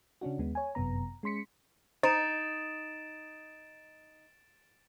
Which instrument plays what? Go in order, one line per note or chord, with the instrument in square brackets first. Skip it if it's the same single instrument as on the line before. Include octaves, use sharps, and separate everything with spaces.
[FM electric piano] C#3 C#4 D4 F#4
D#2 G#3 B3
C#5 G#5
G1 F#2 C3 B3 A#5
G#3 C#4 C6 B6 C#7
[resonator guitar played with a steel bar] D#4 [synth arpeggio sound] C5 [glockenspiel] A6 D7 E7